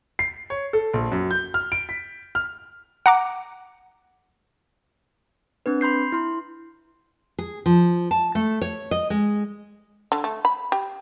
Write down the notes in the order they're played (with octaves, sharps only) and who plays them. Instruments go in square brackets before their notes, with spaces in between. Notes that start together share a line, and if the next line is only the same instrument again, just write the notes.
[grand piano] C7
C#5
A4
A#1
F#2
G6
F6
D7
B6
F6
[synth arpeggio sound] F#5 A#5 D6
[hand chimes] C4 D4 B4
B5 C6 G6 C7
E4 C6
[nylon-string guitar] G#4
F3
A5
A3
C#5
D#5
G#3
[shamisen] D3
A3
B5
G4